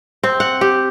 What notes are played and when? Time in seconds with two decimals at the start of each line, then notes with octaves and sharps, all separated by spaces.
0.24 C4
0.40 F#5
0.61 G4